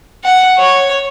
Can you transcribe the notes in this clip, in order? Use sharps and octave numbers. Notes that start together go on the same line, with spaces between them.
F#5
C#5